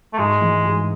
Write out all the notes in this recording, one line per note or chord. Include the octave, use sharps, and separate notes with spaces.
A3
G#2 G#3
E3
G#2